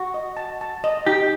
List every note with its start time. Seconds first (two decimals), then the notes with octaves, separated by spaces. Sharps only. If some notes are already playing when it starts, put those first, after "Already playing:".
Already playing: F#4
0.14 D#5
0.37 A5
0.61 A5
0.84 D#5
1.06 D#4 G4